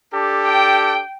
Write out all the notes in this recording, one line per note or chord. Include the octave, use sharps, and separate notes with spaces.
D4 G4 A4
G5